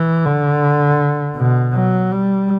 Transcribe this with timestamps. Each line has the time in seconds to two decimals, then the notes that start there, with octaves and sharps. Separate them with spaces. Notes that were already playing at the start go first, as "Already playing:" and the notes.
Already playing: E3
0.25 D3
1.37 B2
1.74 F#3
2.12 G3